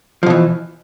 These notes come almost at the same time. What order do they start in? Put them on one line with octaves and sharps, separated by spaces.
F3 B2 E3